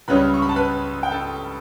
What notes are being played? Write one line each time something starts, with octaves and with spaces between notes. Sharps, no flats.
C#2 C#3 G3 C#4 B4 B5
C#6
B5
A5
B4 B5
G5
A4 A5